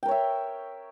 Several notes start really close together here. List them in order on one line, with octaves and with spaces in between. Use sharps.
G5 A#4 C#5 E5